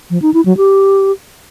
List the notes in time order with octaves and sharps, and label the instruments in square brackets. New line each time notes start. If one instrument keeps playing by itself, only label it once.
[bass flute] F3
D#4
E4
F#3
G4